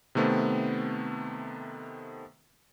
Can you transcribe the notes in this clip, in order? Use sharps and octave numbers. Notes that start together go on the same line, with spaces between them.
C3 D#3 A3 B3 C4